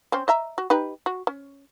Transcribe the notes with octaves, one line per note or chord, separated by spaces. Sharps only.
C4 C#4 C5
D#5 E5 A#5
F#4
D#4 G4 B4
F#4
C#4